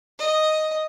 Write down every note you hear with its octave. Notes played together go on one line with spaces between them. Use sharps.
D#5